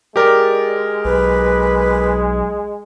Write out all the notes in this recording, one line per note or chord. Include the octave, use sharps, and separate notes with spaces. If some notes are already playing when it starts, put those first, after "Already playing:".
G#3 G4 A#4 D5
B1 B4